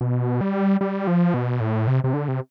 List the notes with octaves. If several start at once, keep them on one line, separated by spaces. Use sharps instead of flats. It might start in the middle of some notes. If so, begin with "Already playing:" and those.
B2
G3
G3
F3
B2
A2
C3
C3
D3
C3